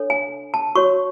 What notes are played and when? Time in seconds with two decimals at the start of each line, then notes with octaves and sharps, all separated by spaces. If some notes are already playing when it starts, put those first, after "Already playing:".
Already playing: D4 A4 C#5
0.10 G#5
0.54 A5
0.75 F#4 C#5 C#6